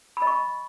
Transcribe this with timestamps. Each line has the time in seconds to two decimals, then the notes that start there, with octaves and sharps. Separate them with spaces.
0.17 B5
0.22 D#5
0.27 C#6